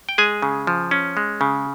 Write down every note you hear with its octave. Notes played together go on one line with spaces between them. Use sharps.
G5
G#3 G#4 G#5
C#3
F3
C#4
G#3
C#3